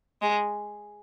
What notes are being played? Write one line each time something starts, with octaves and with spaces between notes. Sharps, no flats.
G#3